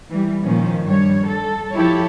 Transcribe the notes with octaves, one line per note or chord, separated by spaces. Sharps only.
E3 G3
A#2 D#3 F3 C#4
G2 G3 C#5
A4
F3 E4 G4 A4 C#5